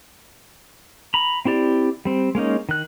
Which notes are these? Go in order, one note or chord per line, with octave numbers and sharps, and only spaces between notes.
A#5 B5
C4 E4 G4 D5
G3 C4
G#3 A#3 C#4 D#4
D#3 F#6